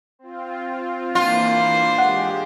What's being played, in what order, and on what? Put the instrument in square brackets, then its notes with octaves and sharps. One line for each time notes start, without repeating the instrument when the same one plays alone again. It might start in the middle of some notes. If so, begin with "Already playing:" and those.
[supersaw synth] C4 F4
[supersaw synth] E3 A#3 [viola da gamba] D4 C5 [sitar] F4
[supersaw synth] G#3 G4 [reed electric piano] F#5